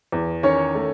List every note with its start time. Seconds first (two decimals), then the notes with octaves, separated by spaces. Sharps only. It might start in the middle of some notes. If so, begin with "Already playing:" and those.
0.12 E2
0.43 D#3 C#4 C#5
0.75 A3